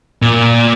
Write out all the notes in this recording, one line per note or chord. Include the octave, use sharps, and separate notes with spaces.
A#2